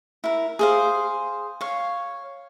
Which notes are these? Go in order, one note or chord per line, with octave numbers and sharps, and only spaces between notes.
E4 A#4
G#4 C5 F5
C#5 F5